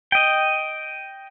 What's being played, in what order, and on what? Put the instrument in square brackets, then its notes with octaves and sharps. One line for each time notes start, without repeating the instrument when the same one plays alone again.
[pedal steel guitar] D#5 G5